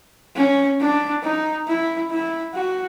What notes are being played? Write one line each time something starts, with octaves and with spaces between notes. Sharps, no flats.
C#4
D4
D#4
E4
E4
F#4